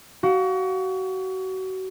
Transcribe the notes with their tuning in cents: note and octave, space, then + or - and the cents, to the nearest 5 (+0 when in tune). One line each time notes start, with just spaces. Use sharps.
F#4 +30 F5 +30